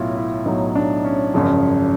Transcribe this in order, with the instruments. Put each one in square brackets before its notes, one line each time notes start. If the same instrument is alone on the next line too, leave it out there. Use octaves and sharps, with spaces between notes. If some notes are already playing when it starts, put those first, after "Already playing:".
Already playing: [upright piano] B1 A2 F#3 E4 F4
E4
B1 A2 F#3 D#4
D4
C#4
G#1 F#2 C#3 F3